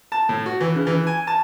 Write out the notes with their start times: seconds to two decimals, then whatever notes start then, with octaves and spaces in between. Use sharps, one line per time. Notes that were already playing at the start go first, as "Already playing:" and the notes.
0.12 A5
0.29 A2
0.46 F#4
0.60 E3
0.75 C#3
0.87 E3
1.07 G#5
1.27 A5